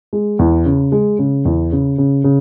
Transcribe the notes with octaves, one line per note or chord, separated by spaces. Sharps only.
G#3
E2
C#3
G#3
C#3
E2
C#3
C#3
C#3